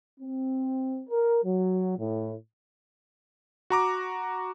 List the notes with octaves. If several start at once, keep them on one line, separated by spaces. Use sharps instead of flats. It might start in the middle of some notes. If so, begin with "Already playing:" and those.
C4
A#4
F#3
A2
F#4 A#5 D6